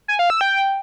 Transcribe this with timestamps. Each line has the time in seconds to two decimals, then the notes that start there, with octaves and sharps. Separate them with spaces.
0.08 G#5
0.19 F5
0.30 E6
0.41 G5